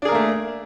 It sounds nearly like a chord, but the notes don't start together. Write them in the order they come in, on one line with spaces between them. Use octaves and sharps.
D4 G#4 A#4 A#3 A3